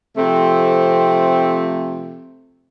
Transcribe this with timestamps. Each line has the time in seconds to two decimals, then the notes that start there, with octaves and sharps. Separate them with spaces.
0.17 C3 F3 A3 C4